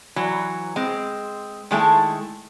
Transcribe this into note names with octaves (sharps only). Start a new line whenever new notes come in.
E3 F#3
G#3 C4
D#3 G#3 A3 E4 A4